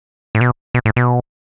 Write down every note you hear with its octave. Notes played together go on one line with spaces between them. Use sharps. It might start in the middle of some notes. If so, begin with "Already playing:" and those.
A2
B2
B2
A2
B2